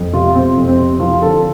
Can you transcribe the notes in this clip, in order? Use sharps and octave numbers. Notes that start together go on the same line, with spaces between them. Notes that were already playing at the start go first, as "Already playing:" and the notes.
Already playing: F2
C3 F4
C3 C4
F2
C4
C3
F3 F4
D3 A4